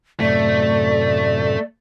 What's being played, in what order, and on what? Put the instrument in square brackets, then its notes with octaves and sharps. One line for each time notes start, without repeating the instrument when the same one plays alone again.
[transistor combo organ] F#2 A2 C3 [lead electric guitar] A3 [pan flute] D5